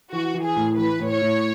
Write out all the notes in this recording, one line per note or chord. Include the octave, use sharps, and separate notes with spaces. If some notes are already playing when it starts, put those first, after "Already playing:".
E3 F#4
E3
G#4
A2
E3 B4
A2
C#5
A2